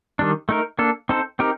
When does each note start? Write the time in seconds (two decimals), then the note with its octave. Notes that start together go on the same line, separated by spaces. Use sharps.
0.19 D#3 G3 D4
0.49 A3 D#4 A#4
0.79 A#3 D4 A4
1.09 C4 D#4 A4 C5
1.39 C4 D#4 G4 A#4